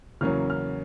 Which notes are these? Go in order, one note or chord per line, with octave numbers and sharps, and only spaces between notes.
E2 C#3 F#3 A#3 C#4 F6
F6